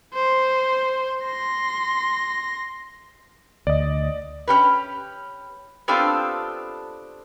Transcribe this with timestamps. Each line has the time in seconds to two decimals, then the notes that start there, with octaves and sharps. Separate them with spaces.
0.14 C5
1.24 C6 A#6
3.67 D2 D5 D#5
4.48 C#4 G4 B4
5.88 B3 C4 D4 F4 G4 A4